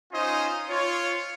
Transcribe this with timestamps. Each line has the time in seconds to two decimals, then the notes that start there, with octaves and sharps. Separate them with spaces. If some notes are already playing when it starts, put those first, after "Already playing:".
0.12 C#4 D#4 F4 C5 D#5
0.69 F4 C#5